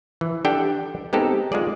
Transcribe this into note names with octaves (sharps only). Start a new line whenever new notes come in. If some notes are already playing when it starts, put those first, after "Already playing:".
E3
D4 G4 A4 F#5 G5
G#3 B3 C4 D#4 G4 A4
G#3 F4 G#4 D5